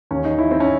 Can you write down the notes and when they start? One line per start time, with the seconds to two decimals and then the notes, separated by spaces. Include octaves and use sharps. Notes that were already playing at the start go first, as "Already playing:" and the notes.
0.11 D#2 C#4
0.25 D#4
0.38 D#3 E4
0.51 C4
0.60 C#4